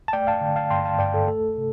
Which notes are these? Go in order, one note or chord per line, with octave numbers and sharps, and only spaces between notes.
A5
A3 D5 G5
F5 A5
D3
F5 A5
G2 G5 C6
F5 A5
G2 D5 G5
A4
A3 A4
C3